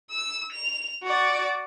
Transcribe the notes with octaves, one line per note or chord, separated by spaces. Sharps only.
E6
F7
F#4 D5